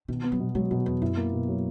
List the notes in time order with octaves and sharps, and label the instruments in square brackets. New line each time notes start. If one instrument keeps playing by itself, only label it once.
[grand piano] B2 [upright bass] D#3
[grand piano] B3
[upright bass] F#3
[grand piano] B2
[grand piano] F#3 [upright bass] G#3
[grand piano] B2 [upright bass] D#3
[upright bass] E2 [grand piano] B3
[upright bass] F#2 [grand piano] E4
[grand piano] A#3
B2
F#3